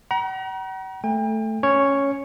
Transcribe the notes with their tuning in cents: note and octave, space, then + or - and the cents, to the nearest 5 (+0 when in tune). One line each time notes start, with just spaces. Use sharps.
F#5 +45 A#5 +35
A3 +0 G5 +40
C#4 +0 C#5 +0